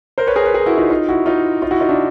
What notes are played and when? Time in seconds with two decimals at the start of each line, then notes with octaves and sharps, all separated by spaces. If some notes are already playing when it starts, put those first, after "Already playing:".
0.18 A#4 C5
0.27 B4 C#5
0.36 G#4 A#4
0.46 B4
0.54 G#4 A#4
0.66 E4 F#4
0.78 D#4 F4
0.90 D#4 F4
1.09 E4 F#4
1.26 D#4 F4
1.62 D#4 F4
1.71 E4 F#4
1.80 D#4 F4
1.89 D4 E4